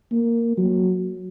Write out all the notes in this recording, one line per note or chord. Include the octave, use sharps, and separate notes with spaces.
A#3
F#3